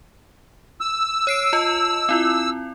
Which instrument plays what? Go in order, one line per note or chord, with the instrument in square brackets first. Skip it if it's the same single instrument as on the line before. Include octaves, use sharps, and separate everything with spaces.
[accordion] E6
[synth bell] C#5 C7 D7
F4 D#5 A5
C4 E4 F4